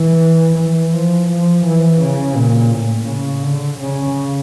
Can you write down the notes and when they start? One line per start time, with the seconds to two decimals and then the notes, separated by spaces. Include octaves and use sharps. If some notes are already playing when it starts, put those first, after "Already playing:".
Already playing: E3
0.57 E3
0.93 F3
1.29 F3
1.65 E3
2.00 C#3
2.36 A#2
2.71 A2
3.08 C#3
3.43 D3
3.80 C#3